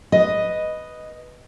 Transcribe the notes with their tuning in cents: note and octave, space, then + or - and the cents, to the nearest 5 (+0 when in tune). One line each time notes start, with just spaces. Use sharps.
B4 +0 D#5 +0